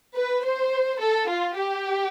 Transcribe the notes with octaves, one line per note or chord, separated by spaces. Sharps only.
B4
C5
A4
F4
G4